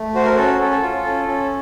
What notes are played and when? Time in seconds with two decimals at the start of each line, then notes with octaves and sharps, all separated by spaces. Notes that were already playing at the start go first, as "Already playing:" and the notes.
Already playing: A3
0.14 F#4 C5
0.26 A#4
0.37 C#4 A4
0.60 A4
0.71 A4
0.82 F4
1.05 C#4
1.28 C#4